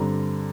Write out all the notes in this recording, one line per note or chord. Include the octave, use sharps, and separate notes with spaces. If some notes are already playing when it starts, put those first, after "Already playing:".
Already playing: G2 D3 G3 C4 A#5